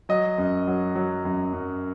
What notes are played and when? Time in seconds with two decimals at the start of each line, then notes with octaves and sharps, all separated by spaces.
0.09 F#3 D#5
0.38 F#2
0.67 F#3
0.95 F#3
1.25 F#2
1.53 F#2